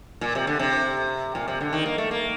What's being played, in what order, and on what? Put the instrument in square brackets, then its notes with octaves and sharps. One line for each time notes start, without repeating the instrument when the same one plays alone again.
[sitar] A#2
C3
D3
C3
A#2
C3
D3
D#3
A#3
A3
A#3